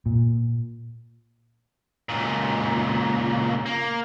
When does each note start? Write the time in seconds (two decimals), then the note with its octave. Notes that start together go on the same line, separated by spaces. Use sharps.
0.06 A#2
2.09 C#2 A#2
3.66 A#3